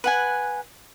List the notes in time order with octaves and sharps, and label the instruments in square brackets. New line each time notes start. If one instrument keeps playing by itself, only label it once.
[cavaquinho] B4 F#5 G#5